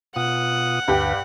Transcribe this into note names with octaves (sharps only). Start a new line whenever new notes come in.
B2 F4 F#5 D#6
D2 G2 G4 B4 G5